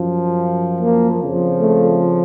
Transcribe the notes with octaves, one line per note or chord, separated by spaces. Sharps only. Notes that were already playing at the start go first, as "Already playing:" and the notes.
Already playing: F#2 F3
A#3
F2 C#3 F3
A3